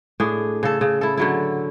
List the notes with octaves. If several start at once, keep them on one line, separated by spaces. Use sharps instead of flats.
A2 D4 G#4
C#3 A4
C#3
E4 A4
D3 F#3 E4